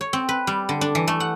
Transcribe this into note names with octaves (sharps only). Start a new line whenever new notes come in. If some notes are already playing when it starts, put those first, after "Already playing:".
C#5
C4
B4
G3
D3
D4
E3
A3
F#5